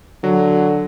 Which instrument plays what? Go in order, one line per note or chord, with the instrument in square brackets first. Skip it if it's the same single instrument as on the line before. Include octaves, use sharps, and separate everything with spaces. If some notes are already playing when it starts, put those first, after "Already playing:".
[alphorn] D3 [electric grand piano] F#3